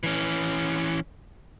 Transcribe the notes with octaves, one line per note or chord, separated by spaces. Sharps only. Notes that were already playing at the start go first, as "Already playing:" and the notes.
E3 C#4